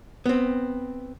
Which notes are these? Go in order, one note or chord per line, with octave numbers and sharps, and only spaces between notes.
B3 C4